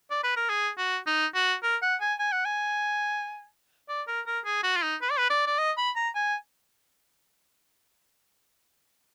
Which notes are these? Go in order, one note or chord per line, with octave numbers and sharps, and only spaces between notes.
D5
B4
A#4
G#4
F#4
D#4
F#4
A#4
F#5
G#5
G#5
F#5
G#5
D5
A#4
A#4
G#4
F#4
F4
D#4
B4
D5
B4
D5
D5
D#5
B5
A#5
G#5